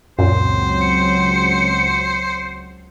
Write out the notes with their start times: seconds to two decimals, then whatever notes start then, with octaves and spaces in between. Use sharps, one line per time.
0.19 C#2 F#2 A#2 F#3 C4 C5
0.81 C#7